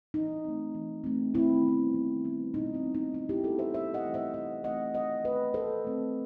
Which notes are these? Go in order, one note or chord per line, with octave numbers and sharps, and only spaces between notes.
E3 D#4
A3 C4
E3
A3 C4
D#3 C4 E4
G3 B3
D#3
G3 B3
B2 D#4
C4
G3 B3
D#4
B2 D#4
E4 G4
G3 B3 F#4 A4
C5 E5
C3 C5 E5
D#5 F#5
E3 A3 C4
C5 E5
C3 D#5 F#5
E3 A3 C4 D#5 F#5
D#3 D#5 F#5
A3 C4 B4 D#5
D#3 A4 C5
A3 C4